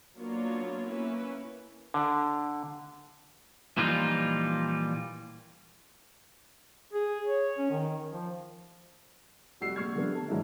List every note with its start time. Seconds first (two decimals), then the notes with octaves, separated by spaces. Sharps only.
0.18 F#3 A#3 B3 D4 F4 C#5
0.87 A#3 C#4 E4 B4
1.94 D3
3.77 A#2 E3 F3 G3 D#4 F4
6.93 G#4
7.26 C#5
7.58 C#4
7.71 D#3
8.11 F3
9.61 F1 G3 F#4 E6 C7
9.76 A#1 G#3 C#6 F6 G#6
9.95 D3 F3 G3 A3 B3 D4
10.15 A5
10.28 G#2 E3 F#3 D4 E4